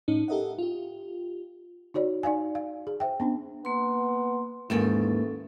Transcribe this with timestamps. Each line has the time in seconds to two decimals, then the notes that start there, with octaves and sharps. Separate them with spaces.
0.08 A2 C#4 D#4
0.28 G4 A4 A#4 D#5 E5 F#5
0.59 F4 G4
1.94 D#4 F#4 C#5 D5
2.23 D#4 D5 F5 G#5
2.55 F5
2.87 G#4
3.00 C5 E5 G5
3.20 B3 C#4 D4
3.65 A#3 B3 C6
4.70 D#2 G#2 E3 A#3 C#4 A4